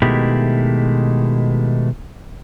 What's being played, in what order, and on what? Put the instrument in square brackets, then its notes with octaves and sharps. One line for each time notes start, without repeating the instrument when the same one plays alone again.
[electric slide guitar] B2 D#3 G#3 A3 E4 G4